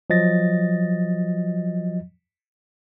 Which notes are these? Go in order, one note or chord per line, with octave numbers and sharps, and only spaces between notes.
F3 F#3 D#5 A6 A#6